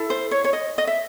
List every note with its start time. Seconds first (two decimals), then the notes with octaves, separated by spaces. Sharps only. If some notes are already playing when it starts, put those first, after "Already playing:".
Already playing: E4 A4
0.10 C5
0.31 C#5
0.44 C#5
0.53 D#5
0.78 D#5
0.87 E5